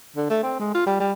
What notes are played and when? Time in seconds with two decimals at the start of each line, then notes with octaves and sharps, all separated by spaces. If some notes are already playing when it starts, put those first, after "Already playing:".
0.16 D3
0.30 A3
0.43 C4
0.59 G#3
0.74 F4
0.86 G3
1.00 G3